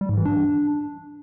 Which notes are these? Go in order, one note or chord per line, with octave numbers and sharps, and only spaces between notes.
G3
G#2
E3
D4